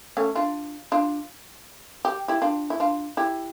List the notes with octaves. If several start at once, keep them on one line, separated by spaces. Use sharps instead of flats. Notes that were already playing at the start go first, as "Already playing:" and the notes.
A3 C#4
D4 F4
D4 F4
G4
E4 G4
D4 F4
E4
D4 F4
E4 G4